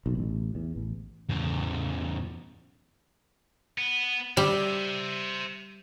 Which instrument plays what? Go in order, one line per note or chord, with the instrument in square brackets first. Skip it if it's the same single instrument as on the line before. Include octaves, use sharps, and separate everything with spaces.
[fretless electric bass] B1
A1
E2
A1
[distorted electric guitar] E2 C#3
B3
[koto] G3 [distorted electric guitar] C5 E5